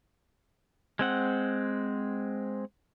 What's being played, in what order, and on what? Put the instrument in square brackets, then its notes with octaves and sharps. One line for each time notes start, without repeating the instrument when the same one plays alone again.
[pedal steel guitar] G#3 C4 F#5